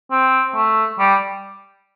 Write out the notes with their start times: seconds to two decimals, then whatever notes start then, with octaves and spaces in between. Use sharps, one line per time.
0.11 C4
0.55 A3
0.99 G3